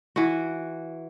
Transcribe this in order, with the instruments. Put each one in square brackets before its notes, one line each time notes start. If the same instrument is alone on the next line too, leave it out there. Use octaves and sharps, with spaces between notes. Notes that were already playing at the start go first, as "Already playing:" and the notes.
[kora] E3 F#4